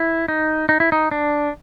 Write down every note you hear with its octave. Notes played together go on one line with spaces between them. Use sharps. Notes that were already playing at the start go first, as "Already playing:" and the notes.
Already playing: E4
D#4
D#4
E4
D#4
D4